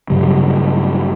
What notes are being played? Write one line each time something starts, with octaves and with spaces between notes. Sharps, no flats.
G2 C#3 F#3 G3